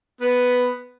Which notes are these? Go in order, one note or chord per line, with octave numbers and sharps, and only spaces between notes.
B3